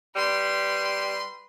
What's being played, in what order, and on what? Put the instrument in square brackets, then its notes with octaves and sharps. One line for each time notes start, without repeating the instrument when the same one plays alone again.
[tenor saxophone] G3 [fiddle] B4 C6